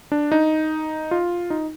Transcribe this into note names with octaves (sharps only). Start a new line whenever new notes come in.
D4
D#4
F4
D#4